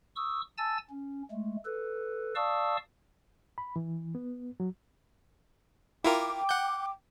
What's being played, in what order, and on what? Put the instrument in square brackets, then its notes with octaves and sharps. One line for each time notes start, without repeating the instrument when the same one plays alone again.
[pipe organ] C#6 D#6 E6
G#5 A5 E6 A6
C#4
G#3 A3
A4 B4
D5 F5 A5 C#6 D#6 E6
[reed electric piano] B5
E3
B3
F#3
[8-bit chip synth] E4 F4 A#4 [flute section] G5 D6
[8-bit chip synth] F#5 G6